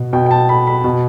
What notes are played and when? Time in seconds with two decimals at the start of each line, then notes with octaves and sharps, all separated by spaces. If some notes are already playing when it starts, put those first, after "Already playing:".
Already playing: B2
0.13 B2 G5
0.26 G5
0.31 A5
0.49 B5
0.67 B5
0.84 B2